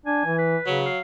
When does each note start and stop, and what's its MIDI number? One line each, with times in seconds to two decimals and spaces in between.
0.06 0.24 62
0.06 0.37 80
0.25 0.57 52
0.38 0.80 71
0.66 0.88 49
0.66 0.99 54
0.85 1.01 77